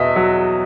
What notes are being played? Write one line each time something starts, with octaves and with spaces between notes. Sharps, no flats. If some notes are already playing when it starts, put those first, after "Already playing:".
Already playing: E2 B2 D#5 E5
F#3